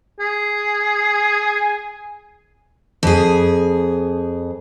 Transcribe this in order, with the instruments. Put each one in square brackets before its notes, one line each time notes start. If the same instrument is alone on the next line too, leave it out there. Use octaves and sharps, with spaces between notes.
[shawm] G#4
[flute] G#5
[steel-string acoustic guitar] F2 G#4